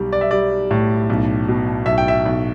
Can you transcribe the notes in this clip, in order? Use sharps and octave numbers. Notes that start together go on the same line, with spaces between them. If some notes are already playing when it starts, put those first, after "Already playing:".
Already playing: B1 G3
D5
E5
G3 D5
A2
B1
B2
B1 E5
G5
E5
B1